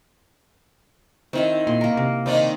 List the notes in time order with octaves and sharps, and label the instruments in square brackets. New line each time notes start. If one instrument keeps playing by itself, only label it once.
[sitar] D#3 [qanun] C4 E4 E5
[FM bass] A#2 [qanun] C6
[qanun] A#3 A#4
[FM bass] C3
[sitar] D#3 D4 D#4 [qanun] C4 D5